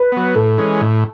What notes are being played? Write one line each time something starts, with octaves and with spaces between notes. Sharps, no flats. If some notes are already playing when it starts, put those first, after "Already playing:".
Already playing: B4
F#3 B3
A2 A4
E3 G#3 C#4
A2